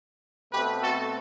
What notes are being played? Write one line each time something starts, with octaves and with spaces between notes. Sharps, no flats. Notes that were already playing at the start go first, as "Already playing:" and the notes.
B2 A3 C4 G4 B4
F#4 A4